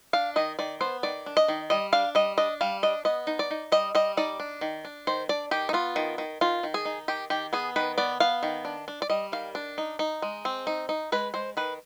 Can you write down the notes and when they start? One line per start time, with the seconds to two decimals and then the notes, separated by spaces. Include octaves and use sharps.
0.13 D4 F5
0.36 D#3 D#5
0.59 D#3 D5
0.81 B3 C5
1.03 D#3 D5
1.26 D4
1.37 D#5
1.48 D#3
1.70 G3 D#5
1.93 D4 F5
2.15 G3 D#5
2.38 D4 D#5
2.61 G3 F5
2.83 D4 D#5
3.05 B3 D#5
3.27 D#4
3.39 D5
3.50 D#4
3.72 G3 D#5
3.95 G3 D#5
4.17 D#4 D5
4.40 D4
4.61 D#3
4.85 D4
5.07 D#3 C5
5.29 D4 D5
5.51 D#3 G4
5.69 D#4
5.73 B3 F4
5.96 D#3
6.18 D#3
6.41 D#3 F4
6.63 D#3
6.74 G#4
6.85 D#4
7.08 D#3 G4
7.30 D#3 G4
7.53 B3 G#4
7.76 D#3 B4
7.98 B3 D5
8.20 B3 F5
8.43 D#3
8.65 D4
8.88 D4
9.02 D5
9.10 G3 D#5
9.32 D#3 F5
9.55 D4
9.78 D#4
9.99 D#4
10.22 G#3
10.45 C4
10.67 D#4
10.89 D#4
11.12 G#3 B4
11.34 G#3 C5
11.57 D#3 B4